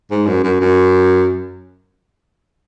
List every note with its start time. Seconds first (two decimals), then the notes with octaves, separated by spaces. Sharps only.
0.11 G#2
0.27 F#2
0.43 F#2
0.61 F#2